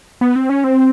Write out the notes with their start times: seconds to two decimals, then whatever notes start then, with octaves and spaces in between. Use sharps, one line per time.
0.21 B3
0.36 C4
0.49 C#4
0.64 C4